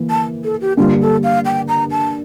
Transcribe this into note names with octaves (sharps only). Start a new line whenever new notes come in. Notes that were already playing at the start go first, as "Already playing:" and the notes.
Already playing: E3 A#3
A5
A4
G4
G2 D3 G3 A#3 F4
A4
F5
G5
A#5
A5